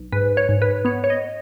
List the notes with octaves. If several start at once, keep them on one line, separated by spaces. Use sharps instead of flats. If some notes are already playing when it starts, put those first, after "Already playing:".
Already playing: B1
G#2 B4
C#5
G#2
B4
B3 C#5
C#5
D#5